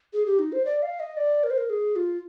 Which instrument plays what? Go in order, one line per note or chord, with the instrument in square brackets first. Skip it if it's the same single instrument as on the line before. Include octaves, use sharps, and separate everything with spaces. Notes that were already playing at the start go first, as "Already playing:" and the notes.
[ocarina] G#4
G4
D#4
C5
D5
F5
D#5
D5
A#4
C5
A#4
G#4
F4